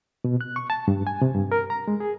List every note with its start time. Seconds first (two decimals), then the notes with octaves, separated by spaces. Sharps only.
0.24 B2
0.41 F#6
0.56 C#6
0.70 A5
0.88 G2
1.07 G#5
1.22 C3
1.35 G2
1.52 A#4
1.70 A#5
1.88 G#3
2.00 G#4